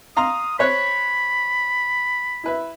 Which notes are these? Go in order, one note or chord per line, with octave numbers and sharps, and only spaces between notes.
F5 A#5 C6 D#6
C5 C#5 B5 F#6
E4 B4 E5